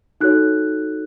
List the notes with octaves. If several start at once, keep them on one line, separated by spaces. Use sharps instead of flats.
D#4 F#4 A4 C#5 F#6